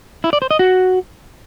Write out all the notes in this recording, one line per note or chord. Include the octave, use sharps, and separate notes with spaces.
E4
D5
C5
D#5
F#4